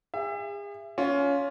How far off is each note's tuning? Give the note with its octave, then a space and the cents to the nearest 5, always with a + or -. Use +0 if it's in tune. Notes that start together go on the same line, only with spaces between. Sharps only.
G#4 -40 E5 +25
C#4 +20 F4 +5